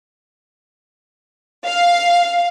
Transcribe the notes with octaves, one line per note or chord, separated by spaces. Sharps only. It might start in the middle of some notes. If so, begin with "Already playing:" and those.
F5